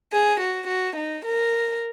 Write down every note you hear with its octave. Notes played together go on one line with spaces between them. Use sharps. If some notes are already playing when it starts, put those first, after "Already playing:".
G#4
F#4
F#4
D#4
A#4